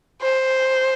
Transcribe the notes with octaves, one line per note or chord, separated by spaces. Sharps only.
C5